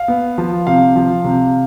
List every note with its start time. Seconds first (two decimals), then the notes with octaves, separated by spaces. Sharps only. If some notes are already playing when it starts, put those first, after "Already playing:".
Already playing: F5
0.08 B3
0.38 F3
0.67 C3 F5
0.96 F3
1.24 C3